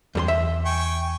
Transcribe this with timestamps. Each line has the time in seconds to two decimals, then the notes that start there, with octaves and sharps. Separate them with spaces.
0.15 E2 G2 A4 C6
0.28 E5
0.65 G5 G#5 C#6